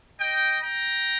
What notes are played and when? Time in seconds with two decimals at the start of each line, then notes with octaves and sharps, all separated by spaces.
0.21 D#5 G5
0.62 G5 A#5